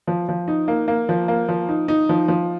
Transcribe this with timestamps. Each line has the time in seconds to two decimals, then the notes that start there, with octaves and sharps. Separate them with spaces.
0.07 F3
0.29 F3
0.48 D#4
0.68 A#3
0.88 A#3
1.09 F3
1.28 A#3
1.48 F3
1.69 D#4
1.88 D#4
2.09 F3
2.28 F3